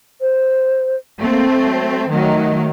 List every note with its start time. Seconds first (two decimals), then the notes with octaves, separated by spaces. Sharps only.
0.21 C5
1.21 A3 A#3 C4
1.58 F#3
2.10 D#3 F#3 A3